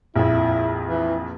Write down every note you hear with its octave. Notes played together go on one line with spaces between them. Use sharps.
A#1 F2 E4
E3